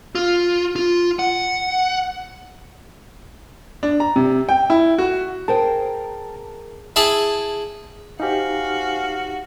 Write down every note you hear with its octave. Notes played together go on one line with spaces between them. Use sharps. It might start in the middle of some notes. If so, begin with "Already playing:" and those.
F4
F4
F#5
D4
A#5
C3
G5
E4
F#4
G#4 A#4 C5 G5 A5
E4 G#4 A5
D#4 F#4 G4 C5 F5 G#5